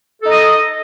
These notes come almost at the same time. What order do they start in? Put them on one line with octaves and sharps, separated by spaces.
A4 D#4 D#5